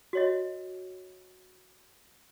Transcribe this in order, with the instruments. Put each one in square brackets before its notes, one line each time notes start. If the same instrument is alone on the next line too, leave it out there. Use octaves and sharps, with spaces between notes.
[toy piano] F#4 C#5 D#5